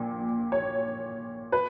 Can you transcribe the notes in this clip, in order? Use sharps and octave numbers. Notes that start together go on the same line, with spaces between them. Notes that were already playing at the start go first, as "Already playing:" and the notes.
Already playing: A#1 A#2
C#5
B4